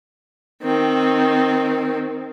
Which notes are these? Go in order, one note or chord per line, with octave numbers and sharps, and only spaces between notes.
D#3 C4